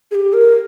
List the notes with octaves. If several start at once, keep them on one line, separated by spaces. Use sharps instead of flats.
G#4
G4
A#4